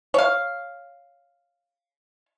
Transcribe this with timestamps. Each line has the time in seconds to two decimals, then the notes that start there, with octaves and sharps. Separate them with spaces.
0.14 C#5 F5